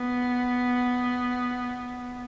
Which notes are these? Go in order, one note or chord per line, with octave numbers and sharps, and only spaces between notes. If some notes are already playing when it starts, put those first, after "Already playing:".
Already playing: B3